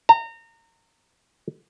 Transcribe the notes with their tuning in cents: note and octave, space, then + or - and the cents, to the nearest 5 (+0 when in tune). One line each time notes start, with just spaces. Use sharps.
A#5 -30